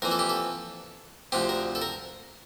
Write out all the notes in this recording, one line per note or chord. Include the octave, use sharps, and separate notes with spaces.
F2 E3 A#3 A#4
A4
G4
A4
D2 C3 F3 C4 G4
A#4
A4
A#4